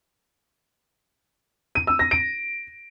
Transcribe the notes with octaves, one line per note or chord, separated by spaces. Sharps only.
D#7
E6
A#6
D7